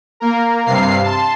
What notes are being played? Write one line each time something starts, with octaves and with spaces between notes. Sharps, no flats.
A#3 A#4
G2 C3 F5 C7
A5 C6